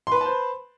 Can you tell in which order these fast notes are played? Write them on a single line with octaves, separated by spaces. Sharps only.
C6 B4 B5 A5 C5